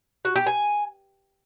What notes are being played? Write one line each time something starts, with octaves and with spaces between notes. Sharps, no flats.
F#4
G4
G#5